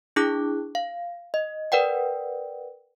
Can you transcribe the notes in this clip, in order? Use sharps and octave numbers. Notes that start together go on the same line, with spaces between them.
D4 E4 G#4 D6 F#6
F5
D#5
A#4 B4 D5 F#5 G5